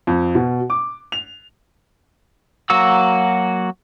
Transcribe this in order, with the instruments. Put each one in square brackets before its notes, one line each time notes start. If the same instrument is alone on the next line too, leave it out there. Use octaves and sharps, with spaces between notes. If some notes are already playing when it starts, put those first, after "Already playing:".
[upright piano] F2
B2
D6
F7
[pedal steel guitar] F#3 A#3 F#4 E6